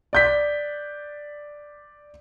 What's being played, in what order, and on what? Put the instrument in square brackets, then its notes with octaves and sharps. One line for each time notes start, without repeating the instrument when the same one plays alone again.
[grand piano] D5 G6 B6